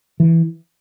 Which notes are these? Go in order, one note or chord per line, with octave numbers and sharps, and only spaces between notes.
E3